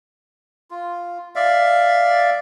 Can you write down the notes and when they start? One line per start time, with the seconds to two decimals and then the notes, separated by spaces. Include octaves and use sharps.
0.71 F4
1.35 D5 E5 F5